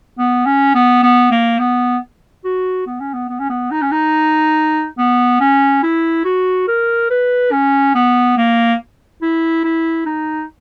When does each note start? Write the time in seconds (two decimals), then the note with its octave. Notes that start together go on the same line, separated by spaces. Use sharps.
0.18 B3
0.46 C#4
0.75 B3
1.03 B3
1.31 A#3
1.59 B3
2.44 F#4
2.87 B3
3.00 C#4
3.14 B3
3.29 B3
3.40 C#4
3.50 B3
3.71 D#4
3.82 C#4
3.92 D#4
4.98 B3
5.41 C#4
5.83 E4
6.25 F#4
6.68 A#4
7.11 B4
7.52 C#4
7.95 B3
8.37 A#3
9.22 E4
9.64 E4
10.06 D#4